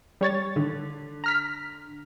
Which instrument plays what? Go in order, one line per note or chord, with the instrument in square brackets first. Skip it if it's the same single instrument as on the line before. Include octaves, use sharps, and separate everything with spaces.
[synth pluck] G3 C#5 A6
[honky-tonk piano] D3
[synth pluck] A#5 F6 B6